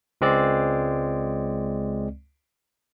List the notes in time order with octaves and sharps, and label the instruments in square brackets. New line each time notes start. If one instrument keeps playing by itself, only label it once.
[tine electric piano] C#2 G#3 C4 D5